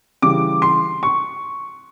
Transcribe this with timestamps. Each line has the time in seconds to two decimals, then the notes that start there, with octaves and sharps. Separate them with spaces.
0.22 C#3 E3 G3 D6
0.62 C6
1.03 C#6